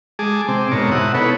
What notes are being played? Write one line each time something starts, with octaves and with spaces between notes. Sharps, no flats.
G#3 G#4 A5 D6 D#6
C3 C4 D6
G#2 B2 D#4 A#4 C#5 A5
C3 E4 F#5 D#6
B3 D#4 A4 B4 C#5